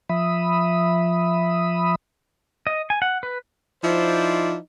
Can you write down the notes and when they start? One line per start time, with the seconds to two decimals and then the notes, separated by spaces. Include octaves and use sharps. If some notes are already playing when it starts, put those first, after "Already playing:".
0.09 F3 E5 B5 D#6
2.67 D#5
2.90 G#5
3.02 F#5
3.23 B4
3.84 F3 D#4 E4 C5 D5